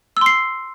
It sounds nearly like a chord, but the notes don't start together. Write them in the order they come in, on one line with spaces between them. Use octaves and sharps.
E6 C6 C7